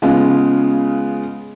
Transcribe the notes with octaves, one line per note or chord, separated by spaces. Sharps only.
C#3 G#3 B3 F4